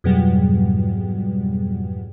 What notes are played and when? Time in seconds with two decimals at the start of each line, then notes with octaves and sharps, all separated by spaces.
0.04 F2 G#2 B2 F#3 G3